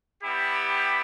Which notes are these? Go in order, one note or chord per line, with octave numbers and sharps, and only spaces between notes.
G3 B3 E4 G4
G5